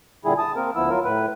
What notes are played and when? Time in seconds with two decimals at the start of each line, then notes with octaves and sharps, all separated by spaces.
0.25 A#2 D3 G3 E4 G#4
0.38 A5 D#6
0.56 A#3 C4 A#4
0.75 D2 F3 B3 E4 E6
0.89 F#3 F4 A#4
1.05 A2 B4